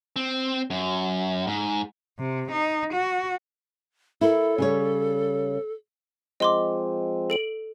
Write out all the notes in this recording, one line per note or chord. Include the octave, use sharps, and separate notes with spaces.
C4
F#2
G#2
C3
D#4
F#4
E4 A4 A#4
C#3 G3 C#5
F3 G#3 C4 D#5 C6 D6
A4 D7 F#7